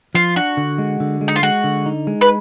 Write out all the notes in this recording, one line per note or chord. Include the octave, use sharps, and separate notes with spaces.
F3 F4
D4 F#4
D3
G#3
D3
G#3
D#4
F4
G#3 F#4
D3
D#4
G#3
B4